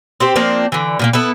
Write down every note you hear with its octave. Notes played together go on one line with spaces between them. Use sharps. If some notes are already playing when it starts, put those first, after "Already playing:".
C4 G4 C5
F3 A#3 C4 D4
D3 E3
A#2 F3 A#3
B3 E4 A4